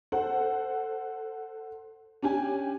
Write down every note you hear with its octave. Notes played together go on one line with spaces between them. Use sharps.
A4 C5 F#5
C#4 D4 G4 G#5